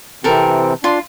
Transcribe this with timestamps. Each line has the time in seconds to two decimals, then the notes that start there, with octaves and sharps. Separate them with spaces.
0.24 C3 E3 C4 A4 A#4 G5
0.84 D4 F4 C6